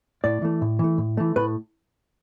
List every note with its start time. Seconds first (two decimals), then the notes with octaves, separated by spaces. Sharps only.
0.24 A2 D5
0.42 E3 A3
0.62 A2
0.79 E3 A3
0.98 A2
1.17 E3 A3
1.36 A2 B4